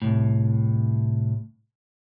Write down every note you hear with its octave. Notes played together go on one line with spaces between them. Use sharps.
C2 A2